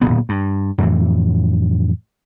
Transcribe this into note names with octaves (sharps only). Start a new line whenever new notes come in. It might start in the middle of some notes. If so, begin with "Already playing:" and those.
D1 F2 A#2 B3
G2
F2 A2 E3